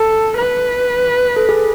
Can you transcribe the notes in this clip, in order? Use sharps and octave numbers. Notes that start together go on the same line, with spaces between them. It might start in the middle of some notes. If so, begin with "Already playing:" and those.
Already playing: A4
B4
A4
G#4